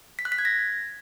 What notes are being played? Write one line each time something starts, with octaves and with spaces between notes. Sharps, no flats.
B6
F#6
B6
G#6
A#6